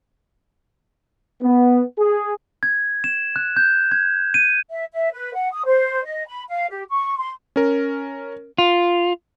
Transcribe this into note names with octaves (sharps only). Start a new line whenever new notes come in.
B3
G#4
G#6
E7
F#6
G6
G#6
D#7
E5
E5
B4
F#5
D#6
C5
D#5
B5
F5
G4
C#6
C6
C#4 A#4
F4